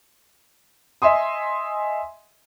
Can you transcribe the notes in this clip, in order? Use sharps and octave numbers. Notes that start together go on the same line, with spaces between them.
D#5 E5 G#5 C6 D#6